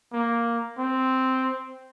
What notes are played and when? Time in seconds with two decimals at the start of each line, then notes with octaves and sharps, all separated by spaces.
0.13 A#3
0.79 C4